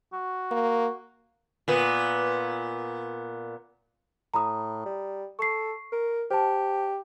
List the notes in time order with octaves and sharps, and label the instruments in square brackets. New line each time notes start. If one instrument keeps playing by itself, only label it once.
[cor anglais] F#4
[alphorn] A#3
[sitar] A#2 B3
[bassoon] A2 [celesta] A#5 B5 D#6
[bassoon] G3
[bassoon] A4 [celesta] C#6 C7
[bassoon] A#4
[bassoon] G4 [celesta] C5 A5